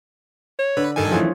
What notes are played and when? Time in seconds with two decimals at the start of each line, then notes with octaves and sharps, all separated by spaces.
0.59 C#5
0.77 D3 B4
0.96 G2 D#3 A4 G#5
1.11 F#2 E3 F3 A3 G#4 C#5